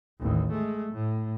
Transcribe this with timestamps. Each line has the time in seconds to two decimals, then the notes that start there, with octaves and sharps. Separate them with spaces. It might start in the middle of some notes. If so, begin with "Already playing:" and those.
0.20 A1 D#2
0.52 G#3 A3
0.92 A2